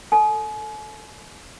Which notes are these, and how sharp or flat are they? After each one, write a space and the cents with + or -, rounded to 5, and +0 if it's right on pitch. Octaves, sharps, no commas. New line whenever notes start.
A4 +15 G#5 +40